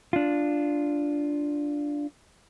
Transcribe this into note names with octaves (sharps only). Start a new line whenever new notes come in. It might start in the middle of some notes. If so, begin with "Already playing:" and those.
D4 F4